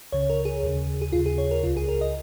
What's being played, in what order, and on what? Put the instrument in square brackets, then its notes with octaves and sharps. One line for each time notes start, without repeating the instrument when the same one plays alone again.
[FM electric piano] C#2 C#3 C#5
A#4
G#4
D#2 C#3
G#4
D#2 C#3 F4
G#4
C#5
A#4
C#2 C#3 F4
G#4
A#4
D#5